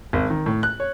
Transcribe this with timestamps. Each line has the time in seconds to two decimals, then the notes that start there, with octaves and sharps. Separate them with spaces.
0.13 G#1
0.30 D#3
0.46 A2
0.63 F#6
0.80 C#5